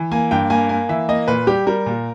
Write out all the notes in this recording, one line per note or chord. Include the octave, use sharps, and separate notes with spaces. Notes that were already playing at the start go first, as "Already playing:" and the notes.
Already playing: E3
A#3 G#5
G2 G5
A#3 G#5
A#3 G#5
E3 E5
A#3 D#5
A#2 B4
G3 G4
G3 A#4
A#2